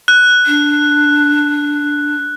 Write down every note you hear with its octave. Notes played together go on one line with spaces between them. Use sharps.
F#6
D4